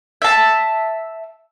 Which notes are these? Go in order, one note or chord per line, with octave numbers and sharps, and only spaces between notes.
E5 A5